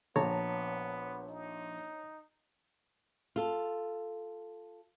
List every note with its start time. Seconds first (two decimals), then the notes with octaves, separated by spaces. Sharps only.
0.16 A#1 B3 C#5 A5 A#5
1.28 D#4
3.36 F4 A4